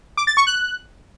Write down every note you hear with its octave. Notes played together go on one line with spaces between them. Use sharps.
D6
A6
C#6
F#6